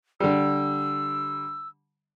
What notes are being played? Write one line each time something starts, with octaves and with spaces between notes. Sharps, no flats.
D3 G3 E6